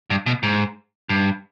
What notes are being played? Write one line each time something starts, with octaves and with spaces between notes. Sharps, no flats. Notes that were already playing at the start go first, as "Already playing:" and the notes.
G2
B2
G#2
G2